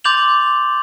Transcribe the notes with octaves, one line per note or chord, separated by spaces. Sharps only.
C6 D6 G6 A6 F7 F#7